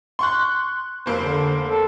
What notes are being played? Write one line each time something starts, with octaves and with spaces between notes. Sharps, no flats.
C6 C#6 F#6
F1 A#3 C5
D3
A4